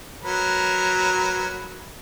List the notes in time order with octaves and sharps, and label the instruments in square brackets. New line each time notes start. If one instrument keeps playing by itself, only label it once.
[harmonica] F#3 A#4 B4